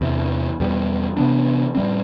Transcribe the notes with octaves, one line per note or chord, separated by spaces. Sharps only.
E2 C3 E3
E2 B2 G3
C3 E3 B3 D4
A2 G3 C4